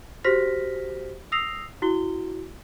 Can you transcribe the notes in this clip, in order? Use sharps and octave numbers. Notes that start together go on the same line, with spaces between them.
F#4 G4 C5 F6 A#6 B6
D#6 E6 A#6 C7 F7
E4 F#4 G7